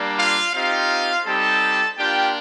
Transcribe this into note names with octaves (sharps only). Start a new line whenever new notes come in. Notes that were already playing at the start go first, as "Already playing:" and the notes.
Already playing: G3 A#3 D4
F4 F5
C4 D#4 F4 G4 F5
G3 C4 D#4 G4 A4 A5
A#3 D4 F4 G4 G5